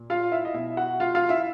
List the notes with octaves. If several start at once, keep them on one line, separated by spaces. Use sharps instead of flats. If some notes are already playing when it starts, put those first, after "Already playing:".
Already playing: A#2
F4 F5
E4 E5
D#5
B2 E4 E5
F#4 F#5
F4 F5
F4 F5
E4 E5